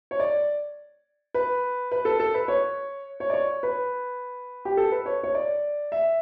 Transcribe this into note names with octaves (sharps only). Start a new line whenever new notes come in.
C#5
D5
B4
B4
A4
A4
B4
C#5
C#5
D5
C#5
B4
G4
A4
B4
C#5
C#5
D5
E5